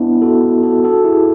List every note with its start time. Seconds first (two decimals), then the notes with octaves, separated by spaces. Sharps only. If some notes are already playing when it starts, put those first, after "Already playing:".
Already playing: B3 D4 E4
0.22 F#4 A4
0.63 F#4 A4
0.84 F#4 A4
1.04 E4 G#4